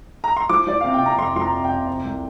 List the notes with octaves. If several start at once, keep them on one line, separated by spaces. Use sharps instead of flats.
A#5
C6
F3 D6
F3 D5
C3 F5
G5
C3 A#5
F2 C6
F3 C6
A#5
C3
G5
C3
C3
C2